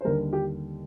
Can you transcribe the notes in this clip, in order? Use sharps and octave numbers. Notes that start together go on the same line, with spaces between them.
C5
D#2 D3 G3 A#4
G4